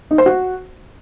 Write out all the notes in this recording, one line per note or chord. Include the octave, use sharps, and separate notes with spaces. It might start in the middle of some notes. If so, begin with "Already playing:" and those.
D#4
C5
F#4